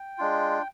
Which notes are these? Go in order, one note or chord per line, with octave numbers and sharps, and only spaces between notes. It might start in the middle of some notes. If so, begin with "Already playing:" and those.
Already playing: G5
G#3 D4 F4